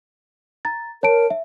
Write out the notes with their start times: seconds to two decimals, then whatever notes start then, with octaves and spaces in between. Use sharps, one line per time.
0.65 A#5 A6
1.03 A#4 C#5 A5 D7
1.30 E5